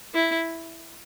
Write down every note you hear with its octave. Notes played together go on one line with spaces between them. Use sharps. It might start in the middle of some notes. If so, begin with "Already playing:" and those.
E4